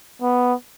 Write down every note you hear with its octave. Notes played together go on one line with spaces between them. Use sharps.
B3